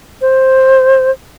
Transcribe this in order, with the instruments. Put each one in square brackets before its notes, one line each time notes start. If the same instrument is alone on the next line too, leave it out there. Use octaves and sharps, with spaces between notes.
[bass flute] C5